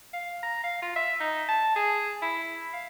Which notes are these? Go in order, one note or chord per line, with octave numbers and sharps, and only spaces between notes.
F5
A#5
F5
F4
E5
D#4
A5
G#4
E4
F5